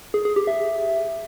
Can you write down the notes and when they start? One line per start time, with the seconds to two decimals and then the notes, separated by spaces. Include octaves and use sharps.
0.14 G#4
0.25 G#4
0.36 G4
0.47 E5